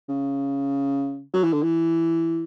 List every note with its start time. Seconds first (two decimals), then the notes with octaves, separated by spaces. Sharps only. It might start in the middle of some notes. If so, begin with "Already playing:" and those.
0.09 C#3
1.34 F#3
1.43 E3
1.53 D3
1.63 E3